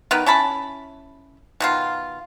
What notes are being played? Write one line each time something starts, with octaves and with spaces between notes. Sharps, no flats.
D#3 B3 A#4 B4
C#4 E4 A5 B5
B2 D#3 F4